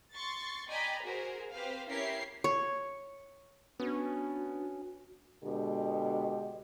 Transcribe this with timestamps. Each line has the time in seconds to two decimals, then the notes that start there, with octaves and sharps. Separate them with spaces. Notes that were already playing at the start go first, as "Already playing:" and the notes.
0.13 C6 C#6 A6
0.69 D5 D#5 G5 G#5 A#5 B5
1.04 F#4 G#4 A#4 C5
1.52 C4 G4 B4 C5 F5
1.86 C#4 E4 G4 A#4 C#5 C7
2.44 C#5
3.80 B3 C#4 D4 F#4
5.43 B2 D3 G#3 G4